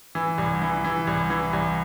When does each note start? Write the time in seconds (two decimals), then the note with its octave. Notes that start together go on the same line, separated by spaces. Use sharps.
0.15 E3
0.38 C2
0.62 E3
0.84 E3
1.07 C2
1.30 E3
1.53 C2